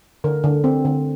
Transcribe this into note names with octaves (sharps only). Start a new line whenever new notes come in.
D3 A#4
D3
C4
D3